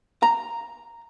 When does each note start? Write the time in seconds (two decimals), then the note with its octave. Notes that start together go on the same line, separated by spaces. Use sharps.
0.23 A#5